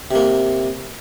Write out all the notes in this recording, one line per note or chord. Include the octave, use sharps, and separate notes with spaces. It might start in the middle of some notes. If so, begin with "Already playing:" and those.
C3 A#3